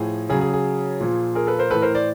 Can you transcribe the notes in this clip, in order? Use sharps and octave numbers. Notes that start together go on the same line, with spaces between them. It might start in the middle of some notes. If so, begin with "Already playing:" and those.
Already playing: A2 F3 G#4
C#3 F#3 G#4
G#4
G#4
A#2 F3
G#4 A#4
A4 B4
A#4 C5
A2 E3 A4 B4
A#4 C5
C5 D5